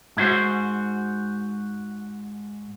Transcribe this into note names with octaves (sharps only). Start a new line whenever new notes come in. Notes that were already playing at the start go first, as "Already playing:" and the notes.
G#2 E4 F#4 C5